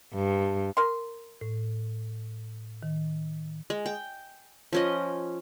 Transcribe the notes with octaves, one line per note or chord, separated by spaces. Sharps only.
G2
A#4 C6
A2
D#3
G#3
G5
F3 C#4 D#5